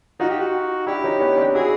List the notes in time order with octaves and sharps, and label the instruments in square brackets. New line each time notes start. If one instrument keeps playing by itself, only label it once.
[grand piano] D#4 F4 [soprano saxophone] F#4
[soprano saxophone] G4
F#4
[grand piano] D4 E4 [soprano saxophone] G4
[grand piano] C#4 D#4
B3 C#4
C4 D4
[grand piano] E4 F#4 [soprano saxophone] G#4